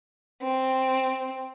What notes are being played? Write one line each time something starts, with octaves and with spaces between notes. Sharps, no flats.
C4